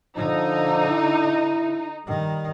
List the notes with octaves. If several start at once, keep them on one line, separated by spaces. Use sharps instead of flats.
D3 F3 D#4
E4
D#3 G3